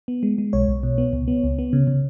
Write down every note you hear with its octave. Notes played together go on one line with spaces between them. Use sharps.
B3
G#3
G#3
B1 C#5
B1
B2
B3
C#2
B3
C#2
B3
C#3
C#3